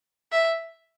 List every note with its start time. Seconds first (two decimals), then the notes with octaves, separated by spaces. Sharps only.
0.32 E5